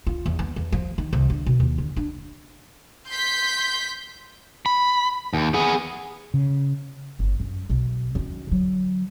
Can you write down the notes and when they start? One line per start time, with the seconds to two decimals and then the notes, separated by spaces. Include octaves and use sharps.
0.07 F4
0.26 E2
0.39 B3
0.56 E2
0.72 F3
0.98 D#3
1.13 C2
1.30 D3
1.46 B2
1.60 D#2
1.78 D3
1.97 D4
3.09 C6 G6 B6
4.66 B5
5.34 D#2
5.54 B3 G#4
6.34 C#3
7.19 G1
7.40 F#2
7.70 B1
8.15 F#2 D#3
8.47 D3 F#3